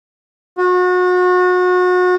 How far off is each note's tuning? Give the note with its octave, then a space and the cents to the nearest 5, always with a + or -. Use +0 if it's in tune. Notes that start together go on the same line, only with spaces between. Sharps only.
F#4 -35